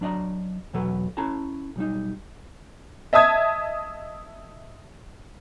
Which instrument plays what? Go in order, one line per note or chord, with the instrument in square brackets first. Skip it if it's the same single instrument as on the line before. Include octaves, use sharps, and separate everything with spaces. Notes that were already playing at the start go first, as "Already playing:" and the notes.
[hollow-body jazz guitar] F#3 D4 D5 D#5 A#5
E2 B2 F#3 A4 B4
C#4 E4 A4 A5 A#5
B1 G3 D#4
[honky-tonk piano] D#5 E5 A5 D#6 G#6